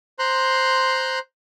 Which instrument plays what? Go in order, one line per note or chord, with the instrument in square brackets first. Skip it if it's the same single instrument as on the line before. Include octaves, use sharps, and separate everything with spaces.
[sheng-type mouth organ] C5 A#5 C6 F#6